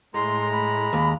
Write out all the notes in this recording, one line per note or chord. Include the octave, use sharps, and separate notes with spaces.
A2 G#3 A#5 C6
B5
D#2